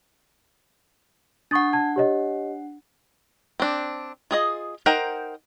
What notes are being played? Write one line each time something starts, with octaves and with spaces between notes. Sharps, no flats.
D4 F#5 C#6 D#6 A6
A5 G#6
G4 C#5 D#5
C4 D4
F4 G#4 D#5
D#4 A#4 C5 F#5 G5